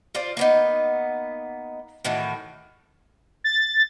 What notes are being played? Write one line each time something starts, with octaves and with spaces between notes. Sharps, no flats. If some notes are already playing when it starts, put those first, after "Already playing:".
F4 C5 D5
A#3 B3 D#4
A2 D#3 E3 F#4
A6